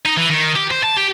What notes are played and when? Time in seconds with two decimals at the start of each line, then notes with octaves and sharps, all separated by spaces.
0.06 D#4
0.17 E3
0.30 D#3
0.56 G4
0.71 C5
0.84 A5
0.98 G4